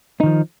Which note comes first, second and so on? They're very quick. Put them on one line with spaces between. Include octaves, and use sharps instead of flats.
D#4 D#3 F3